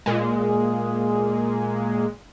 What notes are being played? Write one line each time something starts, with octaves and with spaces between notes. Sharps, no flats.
A#2 G#3